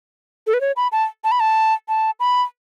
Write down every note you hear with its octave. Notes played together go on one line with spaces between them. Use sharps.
A4
B4
C#5
B5
A5
A5
B5
A5
A5
B5